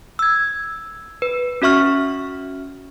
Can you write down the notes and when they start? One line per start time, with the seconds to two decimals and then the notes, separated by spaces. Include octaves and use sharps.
0.19 E6 G#6
1.22 B4
1.62 C#4 F#4 E5 C#6 F6